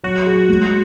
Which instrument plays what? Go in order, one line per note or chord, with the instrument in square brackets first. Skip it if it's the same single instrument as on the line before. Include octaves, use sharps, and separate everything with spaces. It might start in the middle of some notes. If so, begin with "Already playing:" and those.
[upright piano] F#3 [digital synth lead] F#4
[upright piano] G#4
G#3